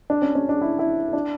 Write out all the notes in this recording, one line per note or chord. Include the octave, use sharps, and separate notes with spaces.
D4
C#4
C#4
D4
E4
E4
D4